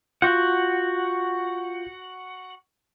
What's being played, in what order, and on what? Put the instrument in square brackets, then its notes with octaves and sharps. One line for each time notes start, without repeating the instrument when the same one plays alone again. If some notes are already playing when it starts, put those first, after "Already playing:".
[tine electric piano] F4 G6 [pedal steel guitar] F#4 F#5